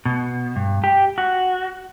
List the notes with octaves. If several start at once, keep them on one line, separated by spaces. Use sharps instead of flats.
B2
G2
G4
F#4